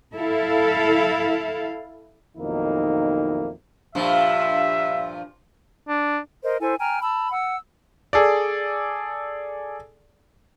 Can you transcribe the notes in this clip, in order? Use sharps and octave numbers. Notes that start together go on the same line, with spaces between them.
E4 A4 F5
B1 F2 D#3 A#3 D#4 E4
G2 A#2 F3 E5
D4
A#4 C5 D#5
E4 A4 C5 G#5
G5 G#5 A#5 F6
A5 B5 E6
F#5 E6
G#4 A4 D5